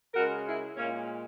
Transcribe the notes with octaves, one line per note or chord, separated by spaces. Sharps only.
C#3 G#3 F#4 A#4
E4 G#4
A#2 G#3 A#3 C#4